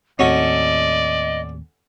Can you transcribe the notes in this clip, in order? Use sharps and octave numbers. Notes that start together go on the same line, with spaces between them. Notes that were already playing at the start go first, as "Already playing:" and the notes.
D#2 A2 C4 C#4 F#4 A4 D5 D#5